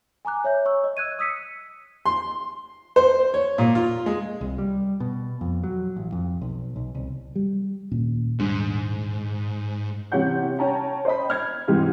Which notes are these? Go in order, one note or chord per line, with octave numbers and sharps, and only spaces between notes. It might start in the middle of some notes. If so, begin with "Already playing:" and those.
G#5 A#5 D6 F#6
C#5 E5 G6
C#5 C#6 E6
D#5
E6 F#6 G#6 D#7
D#6 E6 B6 C#7 D#7
C6
C5
C#5
A#2
F4
G#3
C2
G3
B2
F2
F#3
A1
F2
B1
B1
C2
G3
D#2 A#2 C#4
D#1 G#2 G3 D4
C3 E3 C#4 F#5 G6
C#4 G5 A5 A#5
C5 D#5 B5
F6 G#6
G#2 C3 E3 G4